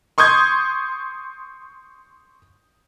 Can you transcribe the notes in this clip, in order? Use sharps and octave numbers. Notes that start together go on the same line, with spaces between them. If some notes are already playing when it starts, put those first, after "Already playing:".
C6 C#6 D#6 G6 G#6